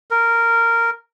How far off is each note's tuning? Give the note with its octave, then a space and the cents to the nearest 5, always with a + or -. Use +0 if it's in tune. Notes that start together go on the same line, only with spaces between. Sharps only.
A#4 -10